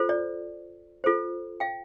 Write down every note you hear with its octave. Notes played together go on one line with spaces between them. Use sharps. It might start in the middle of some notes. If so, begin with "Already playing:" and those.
Already playing: F4 A4 C5
D5
F4 A4 C5
F5 G5